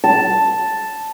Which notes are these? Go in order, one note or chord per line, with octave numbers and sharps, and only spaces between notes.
A5